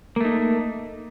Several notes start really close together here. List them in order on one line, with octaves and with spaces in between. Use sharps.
A#3 A3 D#4